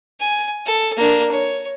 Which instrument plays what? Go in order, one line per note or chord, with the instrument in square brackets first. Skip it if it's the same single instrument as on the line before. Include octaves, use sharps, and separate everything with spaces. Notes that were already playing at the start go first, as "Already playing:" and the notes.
[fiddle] G#5
A4
A#3 D4
C#5